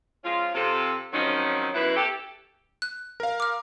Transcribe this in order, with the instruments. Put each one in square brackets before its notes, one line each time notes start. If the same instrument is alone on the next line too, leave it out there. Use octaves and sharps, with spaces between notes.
[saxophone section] F3 G#3 C#4 F4
C3 F4 A4
D#3 F3 F#3 C4 C#4 D#4
F#2 B2 E4 B4
G4 A4
[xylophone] F#6
[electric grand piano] A#4 F5
[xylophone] D6 F6